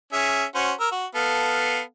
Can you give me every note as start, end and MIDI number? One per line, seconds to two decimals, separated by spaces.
0.13 0.45 61
0.13 0.45 68
0.13 0.45 76
0.55 0.72 61
0.55 0.72 66
0.55 0.72 72
0.80 0.89 70
0.80 0.89 88
0.92 1.06 66
1.15 1.81 59
1.15 1.81 69
1.15 1.81 77